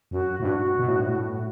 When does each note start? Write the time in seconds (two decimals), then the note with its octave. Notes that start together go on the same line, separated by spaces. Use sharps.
0.11 F#2 F#4
0.40 A2
0.45 G2 F#4
0.79 B2
0.88 A2
0.97 G2
1.07 A2